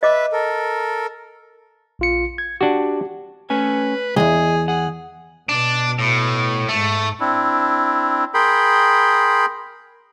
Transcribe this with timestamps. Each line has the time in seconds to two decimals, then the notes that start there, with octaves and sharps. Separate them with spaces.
0.03 B4 D#5 E5 D6
0.33 A4 A#4
1.99 A#1 F4 C#7
2.38 G#6
2.61 D4 F#4 G4
3.50 A3 C#4 B4 G#5
4.16 B1 E2 G#4 D#5
4.68 G#4 F#5
5.49 B2 D4
5.99 A2
6.69 G#2 A3
7.20 C4 D4 E4
8.34 G#4 A#4 G5 B5 C6